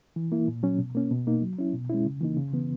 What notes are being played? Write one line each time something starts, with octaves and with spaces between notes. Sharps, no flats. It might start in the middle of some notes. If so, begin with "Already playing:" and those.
E3
A#3 E4
A#2
F#3 C#4
B2
A#3 C#4
B2
A#3 D#4
F#3
C#4 E4
B2
G#3 C#4 E4
C#3
E3 A#3 D#4
C#3
E3 B3